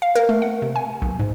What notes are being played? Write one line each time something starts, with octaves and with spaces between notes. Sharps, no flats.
F5
A#4
A3
F#5
C3
G#5
B1
G#2